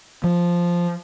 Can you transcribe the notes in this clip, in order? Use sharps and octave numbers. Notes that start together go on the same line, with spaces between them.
F3